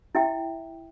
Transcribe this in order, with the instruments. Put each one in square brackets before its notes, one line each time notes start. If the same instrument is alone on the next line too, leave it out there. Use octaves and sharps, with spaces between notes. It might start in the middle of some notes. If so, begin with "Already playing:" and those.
[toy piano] E4 E5 G5